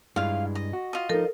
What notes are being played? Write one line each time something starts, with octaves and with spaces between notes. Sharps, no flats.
G2 G#3 E4 F4 F5
D#5
F#4
F4 D#5
F3 D#4 A4 A#4